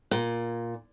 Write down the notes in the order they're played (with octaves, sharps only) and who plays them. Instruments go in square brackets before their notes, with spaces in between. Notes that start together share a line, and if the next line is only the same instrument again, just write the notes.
[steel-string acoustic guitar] A#2